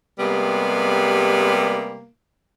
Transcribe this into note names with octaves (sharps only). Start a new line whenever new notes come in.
C3 G3 G#3 A#3 B3